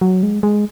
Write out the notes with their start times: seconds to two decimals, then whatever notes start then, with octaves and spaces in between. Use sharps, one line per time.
0.01 F#3
0.23 G#3
0.43 G#3